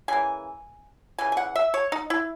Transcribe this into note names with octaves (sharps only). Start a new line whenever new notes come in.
C#3 E3 A#3 G#5
C#3 E3 G#5
G#5
F#5
E5
C#5
D#4
E4